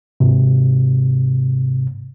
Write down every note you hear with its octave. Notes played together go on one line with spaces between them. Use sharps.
G#2 C3